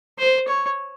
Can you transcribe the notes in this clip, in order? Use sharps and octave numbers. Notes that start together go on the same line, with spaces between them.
C5
C#5